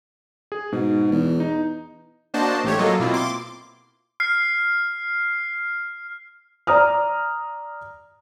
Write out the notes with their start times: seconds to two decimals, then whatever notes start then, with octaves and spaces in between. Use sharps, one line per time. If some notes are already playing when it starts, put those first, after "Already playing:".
0.52 G#4
0.72 G#2 B2
1.12 E2
1.40 D#4
2.34 A#3 D4 F#4 C5 D#5 A5
2.64 A1 A3 G4 C#5
2.78 F#3 A#3 F4 A4 D#5
3.00 B2 A#3 C4 E4 F4
3.14 C6 D6
4.20 F6 C7
6.67 D5 A#5 D#6 F6